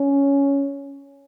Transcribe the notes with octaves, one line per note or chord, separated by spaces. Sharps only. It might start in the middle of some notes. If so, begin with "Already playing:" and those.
Already playing: C#4